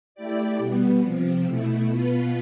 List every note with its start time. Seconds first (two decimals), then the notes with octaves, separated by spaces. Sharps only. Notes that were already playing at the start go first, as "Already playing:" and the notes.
0.15 A3 E4 G4 D5
0.58 B2 G3 B3
1.01 C3 F3 C4
1.44 B2 A3 E4
1.87 B2 B3 F4 B4